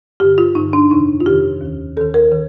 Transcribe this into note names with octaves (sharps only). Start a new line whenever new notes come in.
G2 D3 G4
F4
G2 D3 D#4
D4
F2 C3 D#3 D#4
F4
F2 C3 D#3 G4
D#2 D#3
D#2 D#3 A4
A#4
D#3